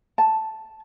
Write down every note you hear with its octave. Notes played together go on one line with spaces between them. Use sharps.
A5